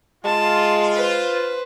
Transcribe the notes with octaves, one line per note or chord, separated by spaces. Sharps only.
G#3 F4 A5
B4 C5